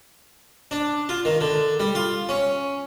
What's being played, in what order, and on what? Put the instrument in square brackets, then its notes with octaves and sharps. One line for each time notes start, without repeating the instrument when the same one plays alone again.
[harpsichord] D4
F4
D#3
D3
G3
F4
C#4